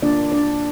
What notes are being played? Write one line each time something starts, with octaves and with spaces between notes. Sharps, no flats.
D3 A#3 D4 F4 D5
D4 D5